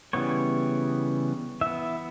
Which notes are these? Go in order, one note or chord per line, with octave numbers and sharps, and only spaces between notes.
C#3 E3 G3 B3 C#5
E3 B3 E5